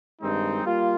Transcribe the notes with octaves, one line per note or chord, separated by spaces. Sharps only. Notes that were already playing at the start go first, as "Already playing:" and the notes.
G2 D#3 G#3 C4 D#4
G3 A#3 F4